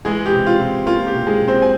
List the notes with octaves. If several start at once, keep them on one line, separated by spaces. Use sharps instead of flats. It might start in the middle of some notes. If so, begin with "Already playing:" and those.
E3 G#3 G#4
G4
C3
F4
C3
A#3 F4
G4
C3
G#3 G#4
C3
C4 C5
G#5